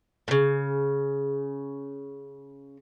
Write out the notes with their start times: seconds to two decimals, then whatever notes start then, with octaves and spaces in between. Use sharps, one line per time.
0.28 A2 C#3